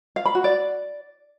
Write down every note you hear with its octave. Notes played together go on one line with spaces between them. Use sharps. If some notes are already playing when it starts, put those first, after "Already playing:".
F5
B5
F#4
D5